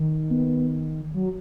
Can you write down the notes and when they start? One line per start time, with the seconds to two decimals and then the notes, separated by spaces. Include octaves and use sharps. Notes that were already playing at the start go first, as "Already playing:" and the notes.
Already playing: D#3
0.31 B3
1.14 F#3